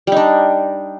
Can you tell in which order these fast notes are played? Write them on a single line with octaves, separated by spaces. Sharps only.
G3 D#4 D4